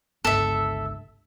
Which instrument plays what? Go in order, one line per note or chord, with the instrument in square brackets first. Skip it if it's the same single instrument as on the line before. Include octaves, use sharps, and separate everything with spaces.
[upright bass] G1 C#2 [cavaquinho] A4 E5